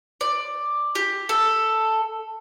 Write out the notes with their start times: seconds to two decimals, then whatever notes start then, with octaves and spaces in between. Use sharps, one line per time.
0.21 D5
0.95 G4
1.29 A4